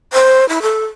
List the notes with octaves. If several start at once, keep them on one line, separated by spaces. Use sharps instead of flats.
C5
E4
A4